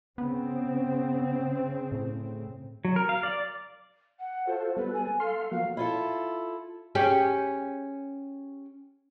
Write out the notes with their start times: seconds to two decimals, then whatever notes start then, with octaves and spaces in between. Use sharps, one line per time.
0.18 C#3 B3 C4
1.92 A2
2.85 F#3
2.96 A#4
3.09 F5
3.23 D5
4.20 F#5
4.47 F4 F#4 A4 C5
4.77 G3 B3 A4 B4
4.93 G#5
5.20 A4 F5 C6
5.51 F3 A#3 F#4 F5
5.77 E4 F4 A4
6.95 C#4 G4 G#4